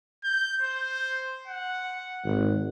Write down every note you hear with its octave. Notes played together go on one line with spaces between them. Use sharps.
G6
C5
F#5
G#1